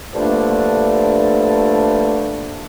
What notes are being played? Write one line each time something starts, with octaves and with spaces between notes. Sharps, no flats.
G2 D3 F3 A3 A#3 D4